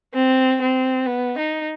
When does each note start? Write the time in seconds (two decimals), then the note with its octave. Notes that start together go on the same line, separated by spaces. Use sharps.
0.14 C4
0.61 C4
1.06 B3
1.38 D#4